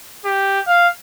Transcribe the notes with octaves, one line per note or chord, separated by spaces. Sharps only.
G4
F5